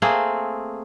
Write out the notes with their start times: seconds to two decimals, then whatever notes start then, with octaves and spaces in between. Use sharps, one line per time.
0.02 A3 A#3 C4 G#4